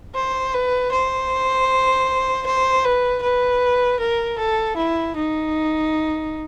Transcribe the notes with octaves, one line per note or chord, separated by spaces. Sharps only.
C5
B4
C5
C5
B4
B4
A#4
A4
E4
D#4